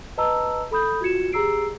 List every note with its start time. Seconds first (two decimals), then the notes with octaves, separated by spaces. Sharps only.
0.17 B4 D#5 A5 A#5 E6
0.71 A4 B5 D#6 G6
1.01 F4 F#4 G#6 C#7 E7
1.33 G4 G#4 A#5 E6 C7 D7